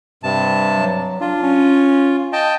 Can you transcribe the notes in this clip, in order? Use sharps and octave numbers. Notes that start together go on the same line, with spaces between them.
G2 C3 A5
F#3
D4 F4
C#4
D#5 G5 A5